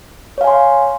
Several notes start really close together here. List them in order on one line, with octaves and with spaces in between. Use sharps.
C#5 F5 G#5 C6